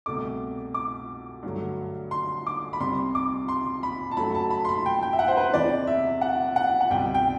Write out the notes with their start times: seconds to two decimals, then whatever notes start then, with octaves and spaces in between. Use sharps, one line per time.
0.06 C2 B2 A3 D6
0.74 D6
1.43 G2 D3 F#3 A3
2.11 C6
2.47 D6
2.73 B5
2.80 C2 C3 G3 C6
3.15 D6
3.48 C6
3.83 B5
4.11 A5
4.17 F#2 F#3 A3 B5
4.35 A5
4.50 B5
4.65 C6
4.69 B5
4.86 G5
5.03 G5
5.13 E5
5.19 F#5
5.28 C5
5.37 B4
5.54 E2 C3 E3 D5
5.87 E5
6.21 F#5
6.56 F#5
6.81 F#5
6.90 C2 B2 G3 G5
7.14 G5